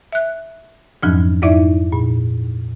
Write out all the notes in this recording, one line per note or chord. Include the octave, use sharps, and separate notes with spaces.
E5 F#6
F2 G#2 F3 F#3 C#4 D4
F2 G#2 D#4 E4 D5 E5
A#2